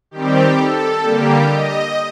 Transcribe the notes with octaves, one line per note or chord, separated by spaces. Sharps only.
D#3 G3 C4 G4
A4
D3 G3 A#3 G4
D#5